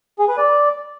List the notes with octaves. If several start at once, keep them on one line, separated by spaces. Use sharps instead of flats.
G#4
B4
D5